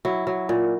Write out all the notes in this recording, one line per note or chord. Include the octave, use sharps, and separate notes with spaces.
F#3 E4
F#3
A#2